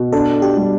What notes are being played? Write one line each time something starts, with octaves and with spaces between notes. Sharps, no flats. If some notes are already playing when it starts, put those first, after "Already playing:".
Already playing: B2
D4 A4
G4
G3